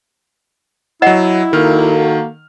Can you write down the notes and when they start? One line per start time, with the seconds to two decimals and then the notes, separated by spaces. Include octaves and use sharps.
1.02 F#3 E4 D#5 F#5 E7
1.53 D#3 A#3 F#4 A4 F6